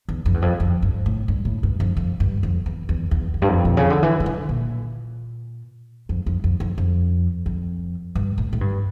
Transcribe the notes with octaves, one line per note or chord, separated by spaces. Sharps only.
E2
F2
E2
F2
F2
G2
A2
G2
A2
G2
F2
F2
G2
F2
E2
E2
E2
F2
G2
F2
A#2
C#3
D3
E3
E3
D3
A#2
F2
F2
F2
F2
F2
F2
G2
A2
A2
G2